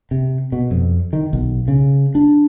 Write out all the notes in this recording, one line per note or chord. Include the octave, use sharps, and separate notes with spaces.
C3
B2
F2
D#3
B1
C#3
D4